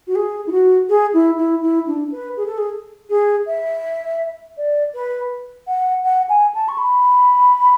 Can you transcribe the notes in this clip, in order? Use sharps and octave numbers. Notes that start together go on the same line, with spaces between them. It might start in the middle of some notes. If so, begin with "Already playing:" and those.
F#4
G#4
E4
F#4
G#4
E4
E4
E4
D4
B4
G#4
A4
G#4
G#4
E5
D5
B4
F#5
F#5
G#5
A5
C#6
B5